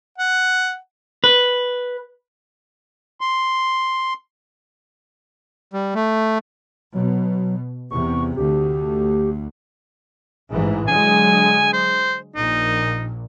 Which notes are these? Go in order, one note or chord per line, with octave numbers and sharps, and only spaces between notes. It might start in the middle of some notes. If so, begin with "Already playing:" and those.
F#5
B4
C6
G3
A3
B2 F#3
E2 C3 C#6
D2 G4
A1 G#2 E3
D3 F#3 G#3 G#5
C5
A#1 A#2 D#4